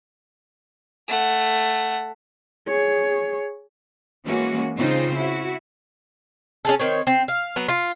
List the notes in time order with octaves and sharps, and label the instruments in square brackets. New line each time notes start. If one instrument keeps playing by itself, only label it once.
[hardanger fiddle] A3 F#5
[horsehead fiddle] G#4 C#5
[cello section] E3 G#3 A#3 C#4 F#4
C#3 C4 D#4 F4 C5
E4 F#4
[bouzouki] C#4 G#4 A4
D#3 C4 C#5
C4
F5
F#3 B3
F4